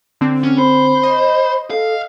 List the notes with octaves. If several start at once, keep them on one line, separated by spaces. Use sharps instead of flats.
D3 C4
C#4
C5 B5
D#5
A4 F5